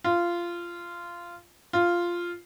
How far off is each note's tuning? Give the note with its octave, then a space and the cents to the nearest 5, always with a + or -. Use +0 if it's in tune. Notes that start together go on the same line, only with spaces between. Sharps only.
F4 -15
F4 -5